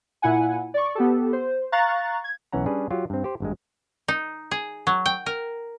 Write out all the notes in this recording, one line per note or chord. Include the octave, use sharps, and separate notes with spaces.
A#2 E4 F#5 G#5
D5 C#6
B3 G4 A4
C5
F5 A#5 C#6 F#6 A6
G#6
B1 E3 C#4 F#5 A#5
G3 C#4 D4 G#4 B4
F#3 F4 G4
G2 C4
G4 C5
G#1 G2 G#3
D#4
G#4
F#3
G5
A#4